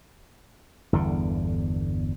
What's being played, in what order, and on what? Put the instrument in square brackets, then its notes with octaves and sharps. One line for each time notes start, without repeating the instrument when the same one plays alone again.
[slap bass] G1 E2 D3